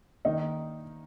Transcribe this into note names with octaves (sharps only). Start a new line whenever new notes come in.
D#3 A#3 D#4